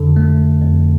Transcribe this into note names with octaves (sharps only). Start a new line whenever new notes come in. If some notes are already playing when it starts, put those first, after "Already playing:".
Already playing: F2 D3 A4
A3
F2